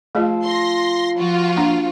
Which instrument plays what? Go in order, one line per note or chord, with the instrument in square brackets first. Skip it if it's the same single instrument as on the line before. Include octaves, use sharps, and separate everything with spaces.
[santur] F3 E6 [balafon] A3 G#4 D#5
[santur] A#5 [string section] C6 A#6
[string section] F3 F4 F#4
[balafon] A#3 D4